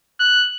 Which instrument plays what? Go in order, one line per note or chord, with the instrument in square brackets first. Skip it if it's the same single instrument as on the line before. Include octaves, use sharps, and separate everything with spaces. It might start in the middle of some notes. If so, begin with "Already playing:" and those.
[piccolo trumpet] F#6